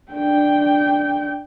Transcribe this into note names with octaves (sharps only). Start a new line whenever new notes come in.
D4 G5